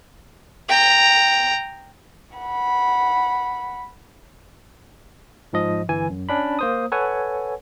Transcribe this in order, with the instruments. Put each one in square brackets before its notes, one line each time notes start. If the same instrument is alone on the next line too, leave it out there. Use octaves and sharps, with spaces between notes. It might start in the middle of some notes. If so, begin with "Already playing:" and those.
[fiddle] G5 A#5
[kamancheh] F#5 B5
[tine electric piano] G#2 F3 D#5
G1 E3 G#5
F#2
C#4 D4 B5
A#3 C5 D#6
A4 B4 C#5 F#5 G#5